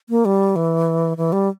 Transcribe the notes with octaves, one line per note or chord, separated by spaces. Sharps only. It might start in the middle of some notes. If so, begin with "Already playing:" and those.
A#3
G3
E3
E3
G3